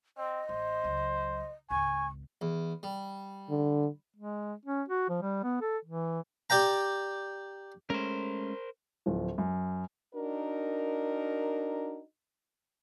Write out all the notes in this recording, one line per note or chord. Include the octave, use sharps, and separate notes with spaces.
C4 D#5
A1 C5
C#2 F#3
G#1 C#2 G#5 C#6
E2
G3
D3
G#3
C#4
F#4
F3
G3
B3
A4
E3
G4 D5 G5 A#5
G#3 A3 C#4 A#4 C5
D1 F3
F#2
D4 D#4 F#4 A#4